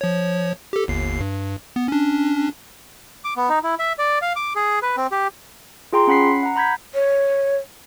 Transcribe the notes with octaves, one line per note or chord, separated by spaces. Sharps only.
F3 C#5
G4 A4
G1 D#2 C7
G2
B3
C#4 D4
D6
B3
D#4
E4
E5
D5
F5
D6
G#4
B4
C4
G4
F4 G#4 G5 A#5 C6
C#4 F#5 B5 B6 C7
F#5 A#5
A#5 B5 G6 G#6 B6
C#5